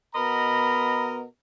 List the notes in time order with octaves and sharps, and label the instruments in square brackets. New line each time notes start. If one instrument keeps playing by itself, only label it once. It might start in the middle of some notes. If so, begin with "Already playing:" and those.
[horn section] B2 B3 A#4 D#5 A#5 B5